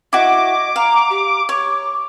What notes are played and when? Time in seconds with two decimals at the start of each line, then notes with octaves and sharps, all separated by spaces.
0.13 E4 F#4 D#5 D6
0.76 F5 A#5
1.10 G4
1.49 C#5 D6